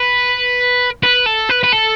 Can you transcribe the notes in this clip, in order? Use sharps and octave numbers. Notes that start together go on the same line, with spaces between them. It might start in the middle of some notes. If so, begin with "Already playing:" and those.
Already playing: B4
B4
A4
B4
B4
A4